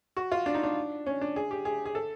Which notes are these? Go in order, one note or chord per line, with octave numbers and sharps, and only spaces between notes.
F#4
F4
D4
D#4
D4
C#4
D4
G#4
G4
G#4
G#4
A4